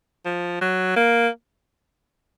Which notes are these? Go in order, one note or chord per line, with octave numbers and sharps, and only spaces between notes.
F3
F#3
A#3